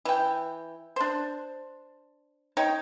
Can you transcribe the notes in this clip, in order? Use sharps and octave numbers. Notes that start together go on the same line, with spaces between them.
E3 G5
D4 C5
D#4 C#5 G5